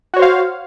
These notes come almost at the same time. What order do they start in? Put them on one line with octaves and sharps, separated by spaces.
F#4 C#5 C5 F5